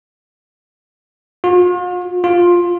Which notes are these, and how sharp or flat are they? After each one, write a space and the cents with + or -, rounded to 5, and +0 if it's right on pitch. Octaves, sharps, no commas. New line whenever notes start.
F4 +45
F4 +10